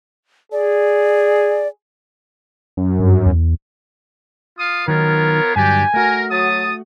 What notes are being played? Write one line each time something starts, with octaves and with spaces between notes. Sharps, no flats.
G#4 D5
F#2
G2
E2
F4 F5 D#6
D#3 F#3 B3 D#4 F4 A#4 C#5
G2 D3 F#3 D4 G4 G#5
A3 F#4 A#4
F#3 A5 D#6